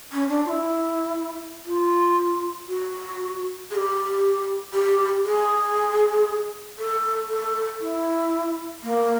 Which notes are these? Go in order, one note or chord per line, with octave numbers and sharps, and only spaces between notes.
C#4
D4
F4
E4
F4
F#4
G#4
G4
G4
G#4
A4
A4
E4
A#3